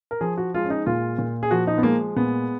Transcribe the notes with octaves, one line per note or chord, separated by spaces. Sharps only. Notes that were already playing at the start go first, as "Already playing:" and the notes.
A#4
F3 G#4
F#4
G#3 F4
C#4
D#4
A#2 F4
A#2
G#4
F3 F#4
D#4
B3
G#3 A#3
A#2 B3